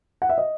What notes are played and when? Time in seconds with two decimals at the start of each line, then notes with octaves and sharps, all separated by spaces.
0.22 F#5
0.29 E5
0.38 D#5